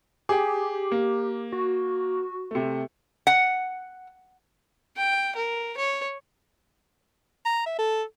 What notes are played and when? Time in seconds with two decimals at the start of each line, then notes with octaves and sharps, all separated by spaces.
0.29 G4 G#4 G5
0.92 A#3
1.53 F#4
2.51 C3 A3
3.27 F#5
4.97 G5
5.36 A#4
5.77 C#5
7.46 A#5
7.66 E5
7.79 A4